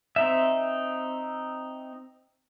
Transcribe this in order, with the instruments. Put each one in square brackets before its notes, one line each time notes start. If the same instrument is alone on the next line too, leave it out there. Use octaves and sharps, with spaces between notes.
[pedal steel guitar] C4 D#4 E5